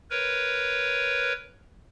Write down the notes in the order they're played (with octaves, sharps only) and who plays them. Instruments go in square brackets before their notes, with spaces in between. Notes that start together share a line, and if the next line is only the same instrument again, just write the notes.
[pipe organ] A#4 B4 C#5